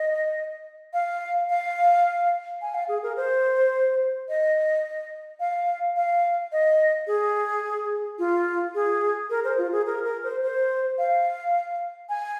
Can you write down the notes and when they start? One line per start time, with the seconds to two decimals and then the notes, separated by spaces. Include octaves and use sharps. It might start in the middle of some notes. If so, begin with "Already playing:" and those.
Already playing: D#5
0.93 F5
1.50 F5
2.62 G#5
2.74 F5
2.89 G#4
3.03 A#4
3.17 C5
4.29 D#5
5.40 F5
5.96 F5
6.52 D#5
7.07 G#4
8.19 F4
8.75 G#4
9.30 A#4
9.44 C5
9.58 F4
9.72 G#4
9.86 A#4
10.04 A#4
10.24 C5
10.42 C5
10.98 F5
12.09 G#5